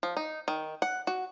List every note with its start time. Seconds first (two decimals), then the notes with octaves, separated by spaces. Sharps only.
0.03 F3
0.17 D#4
0.48 D#3
0.82 F#5
1.07 F#4